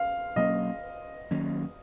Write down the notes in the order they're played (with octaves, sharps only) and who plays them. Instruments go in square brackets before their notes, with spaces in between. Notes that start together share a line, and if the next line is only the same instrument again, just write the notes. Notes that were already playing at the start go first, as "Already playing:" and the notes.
Already playing: [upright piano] F5
[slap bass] B2 F#3 A#3 C#4 [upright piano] D#5
[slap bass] D#3 F#3 A#3 C#4